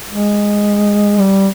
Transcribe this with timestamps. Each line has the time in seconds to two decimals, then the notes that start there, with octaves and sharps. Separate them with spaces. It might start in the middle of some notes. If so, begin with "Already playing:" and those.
0.09 G#3
1.19 G3